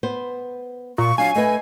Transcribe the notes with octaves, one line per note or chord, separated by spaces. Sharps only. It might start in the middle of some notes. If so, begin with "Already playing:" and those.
B3 C5
A#2 C#6
F#3 D4 F5 G#5
A3 B4 D#5